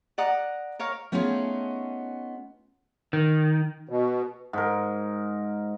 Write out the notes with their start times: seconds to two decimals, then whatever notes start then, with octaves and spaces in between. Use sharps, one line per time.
0.18 D5 F#5 A#5 D#6
0.79 A#4 C#5 F5
1.12 A3 B3 C#4 D#4 F4 G#4
3.13 D#3
3.89 B2
4.53 G#2 A#4